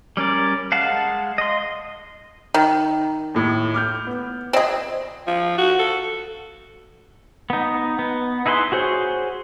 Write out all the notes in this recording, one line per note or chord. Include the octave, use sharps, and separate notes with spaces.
G3 C#4 A#4 D5
G#3 F5 F#5 A5
D#5 C6
D#3
D#2 A2
D6 F6 G6
B3
C4 G#4 D5 D#5
F3
F#4
A4
B3 D#4
B3
D#4 E4 G#4 B4 C6
F#4 G#4 C5 C#5